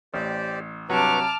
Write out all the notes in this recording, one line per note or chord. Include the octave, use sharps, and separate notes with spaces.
A1 G4 C5 D5
G2 C3 F#3 B4 A5 C#6 D6 F6